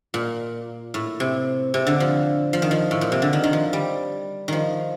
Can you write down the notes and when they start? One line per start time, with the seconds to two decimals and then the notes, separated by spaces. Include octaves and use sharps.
0.14 A#2
0.94 A2
1.20 C3
1.74 C3
1.87 D3
2.00 F3
2.53 F3
2.62 D#3
2.71 F3
2.91 A2
3.01 A#2
3.12 C3
3.22 D3
3.33 D#3
3.44 D#3
3.53 F3
3.73 G3
4.48 D#3 F3